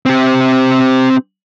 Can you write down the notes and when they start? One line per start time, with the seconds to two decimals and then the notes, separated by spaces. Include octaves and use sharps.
0.06 C4 G4